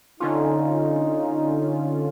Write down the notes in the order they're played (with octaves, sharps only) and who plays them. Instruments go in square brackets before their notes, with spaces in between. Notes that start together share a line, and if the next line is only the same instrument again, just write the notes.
[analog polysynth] D3 C#4 F4 [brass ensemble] D#4